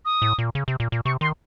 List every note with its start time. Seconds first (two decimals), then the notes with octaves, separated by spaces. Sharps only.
0.05 D#6
0.22 A2
0.38 A#2
0.55 C#3
0.68 C3
0.80 A#2
0.92 A#2
1.05 C3 C#6
1.21 D#3 C6